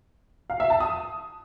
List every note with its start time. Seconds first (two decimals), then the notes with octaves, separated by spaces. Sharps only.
0.50 F5
0.60 E5
0.70 A5
0.80 D#6